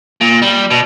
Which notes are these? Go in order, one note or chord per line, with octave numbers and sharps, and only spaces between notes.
A#2
G3
B2